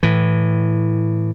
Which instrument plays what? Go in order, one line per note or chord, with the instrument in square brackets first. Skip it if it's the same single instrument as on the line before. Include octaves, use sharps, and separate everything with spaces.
[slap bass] A2 E3